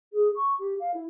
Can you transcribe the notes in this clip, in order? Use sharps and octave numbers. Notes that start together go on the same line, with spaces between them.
G#4
C#6
G4
F5
E4